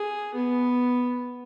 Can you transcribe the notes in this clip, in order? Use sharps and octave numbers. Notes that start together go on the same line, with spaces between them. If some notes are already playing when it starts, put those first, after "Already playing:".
Already playing: G#4
B3